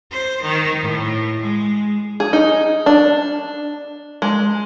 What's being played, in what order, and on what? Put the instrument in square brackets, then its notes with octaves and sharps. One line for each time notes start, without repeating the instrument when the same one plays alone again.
[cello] C5
D#3
A2
G#3
[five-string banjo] G#4
D#4
D4
G#3